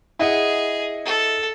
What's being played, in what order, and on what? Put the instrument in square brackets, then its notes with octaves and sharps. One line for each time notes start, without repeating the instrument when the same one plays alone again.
[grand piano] E4 D#5 F#5 [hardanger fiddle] G#4
[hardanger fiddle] A4